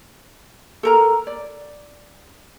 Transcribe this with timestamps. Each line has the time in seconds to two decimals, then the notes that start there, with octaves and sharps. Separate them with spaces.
0.83 A4 A#4 A#5
1.27 D5